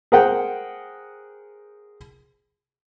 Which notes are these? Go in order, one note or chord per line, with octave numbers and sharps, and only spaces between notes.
G#4 A#4 C5 F#5 G5